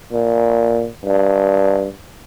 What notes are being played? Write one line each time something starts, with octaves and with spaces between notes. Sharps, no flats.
A#2
G2